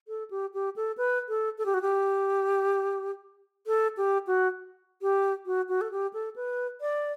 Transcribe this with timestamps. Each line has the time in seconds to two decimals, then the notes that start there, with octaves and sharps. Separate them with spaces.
0.08 A4
0.30 G4
0.54 G4
0.76 A4
0.97 B4
1.28 A4
1.58 A4
1.66 G4
1.74 F#4
1.82 G4
3.67 A4
3.97 G4
4.27 F#4
5.02 G4
5.46 F#4
5.69 F#4
5.81 A4
5.91 G4
6.13 A4
6.36 B4
6.81 D5